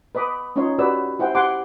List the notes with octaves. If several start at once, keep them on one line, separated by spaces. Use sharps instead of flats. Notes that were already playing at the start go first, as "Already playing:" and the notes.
B4 D#5 B5 D6 D#6
C#4 D#4 F4 C#5 D#5 C6
F#4 G4 B4 C#5 D5 E6
E4 G4 C5 E5 F#5 G5
G4 F#5 G#5 B5 C6 D6